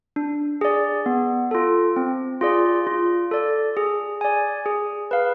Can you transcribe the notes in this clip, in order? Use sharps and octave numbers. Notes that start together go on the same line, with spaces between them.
D4
G#4 D5
B3
F4 A4
C4
F4 G#4 D5
F4
A4 D5
G#4
D5 G#5
G#4
B4 F5